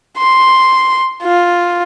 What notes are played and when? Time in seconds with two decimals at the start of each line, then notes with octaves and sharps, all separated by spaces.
0.18 C6
1.23 F4